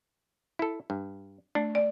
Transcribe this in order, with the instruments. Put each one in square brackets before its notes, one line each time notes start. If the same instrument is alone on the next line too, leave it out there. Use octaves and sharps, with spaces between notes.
[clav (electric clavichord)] E4 A4
G2
[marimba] A3 [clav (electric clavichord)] D4
[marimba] D5